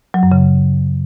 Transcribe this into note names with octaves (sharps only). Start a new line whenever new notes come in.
F#3
F#2
C#3